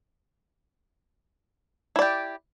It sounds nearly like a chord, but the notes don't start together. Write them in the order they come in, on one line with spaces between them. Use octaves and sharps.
E4 D5 G4